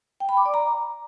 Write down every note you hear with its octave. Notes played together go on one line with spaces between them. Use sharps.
G5
B5
D6
D5
A#5